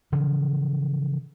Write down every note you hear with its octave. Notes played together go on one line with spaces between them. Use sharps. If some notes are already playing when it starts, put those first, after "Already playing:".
C#3 E3 F3